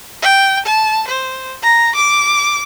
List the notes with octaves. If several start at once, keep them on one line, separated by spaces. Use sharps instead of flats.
G5
A5
C5
A#5
D6